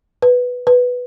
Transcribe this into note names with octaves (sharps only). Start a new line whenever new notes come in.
B4
B4